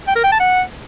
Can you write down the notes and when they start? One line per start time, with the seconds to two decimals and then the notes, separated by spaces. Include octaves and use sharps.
0.08 G5
0.16 A#4
0.24 G5
0.32 A5
0.40 F#5